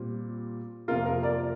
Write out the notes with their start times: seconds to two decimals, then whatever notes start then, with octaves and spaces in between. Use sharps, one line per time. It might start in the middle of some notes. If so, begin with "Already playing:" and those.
Already playing: A#2 G3 C4
0.88 F2 C3 A#3 F4 A#4
1.05 F4 A#4
1.23 A#4 D5